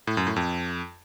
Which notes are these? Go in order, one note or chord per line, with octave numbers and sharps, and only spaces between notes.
A2
F#2
A2
F2